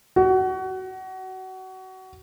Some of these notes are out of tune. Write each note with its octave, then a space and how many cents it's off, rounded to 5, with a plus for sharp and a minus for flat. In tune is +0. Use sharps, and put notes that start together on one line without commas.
F#4 +25